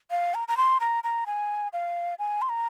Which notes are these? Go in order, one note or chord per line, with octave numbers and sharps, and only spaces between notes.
F5
A#5
A#5
C6
A#5
A#5
G#5
F5
G#5
C6
A#5